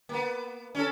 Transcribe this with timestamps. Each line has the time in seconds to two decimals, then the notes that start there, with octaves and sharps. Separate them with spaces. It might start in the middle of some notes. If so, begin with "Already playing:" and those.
0.09 A#3 B3
0.75 C#4 A4